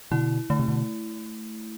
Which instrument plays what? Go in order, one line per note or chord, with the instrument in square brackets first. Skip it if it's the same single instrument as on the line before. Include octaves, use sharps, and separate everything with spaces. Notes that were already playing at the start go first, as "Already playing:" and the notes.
[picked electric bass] B2 D3 [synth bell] E4
[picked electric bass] D3 [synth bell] A3
[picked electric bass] C3
B2 D3